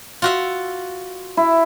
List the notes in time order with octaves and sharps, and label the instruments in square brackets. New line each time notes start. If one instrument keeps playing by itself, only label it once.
[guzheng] F4 F#4 E5
[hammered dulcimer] E4